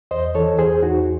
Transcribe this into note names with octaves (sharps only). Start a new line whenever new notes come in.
E2 C5 D#5
E3 A4 C#5
E2 G#4 C5
E2 D#4 F#4